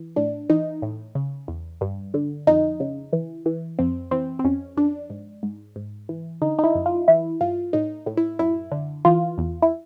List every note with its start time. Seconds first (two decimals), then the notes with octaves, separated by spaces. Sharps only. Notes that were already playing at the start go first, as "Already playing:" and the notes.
Already playing: E3
0.16 A2 D4
0.50 E3 D#4
0.82 A2
1.15 C#3
1.48 E2
1.81 G2
2.14 D3
2.47 F2 D#4
2.80 C#3
3.13 E3
3.46 E3
3.79 F2 C4
4.11 E3 C4
4.39 C4
4.44 F2 C#4
4.77 F2 D4
5.10 G#2
5.43 G#2
5.76 G#2
6.09 E3
6.42 D3 D#4
6.59 D#4
6.64 E4
6.75 F#2
6.86 F4
7.08 E3 E4
7.41 G2 F4
7.73 A2 D#4
8.06 A2
8.17 E4
8.39 F#2 E4
8.72 D3
9.05 E3 F4
9.38 E2
9.62 E4